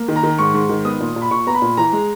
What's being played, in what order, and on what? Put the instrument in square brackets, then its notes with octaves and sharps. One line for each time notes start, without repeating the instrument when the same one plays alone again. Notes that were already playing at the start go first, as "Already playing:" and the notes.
Already playing: [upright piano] A#3
D#3
A#5
D#3
G#2 C#6
G#2
D#3
B3 D#6
A#2
A#2
B5
A#2 C#6
B3 A#5
B5
A#2
E3 A#5
G#3